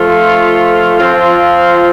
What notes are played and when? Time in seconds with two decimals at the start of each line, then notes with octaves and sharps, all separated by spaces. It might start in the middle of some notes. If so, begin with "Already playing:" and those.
Already playing: F3 A3 F4
0.97 F3 C4 F4